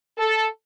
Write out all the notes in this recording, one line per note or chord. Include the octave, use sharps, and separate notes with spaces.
A4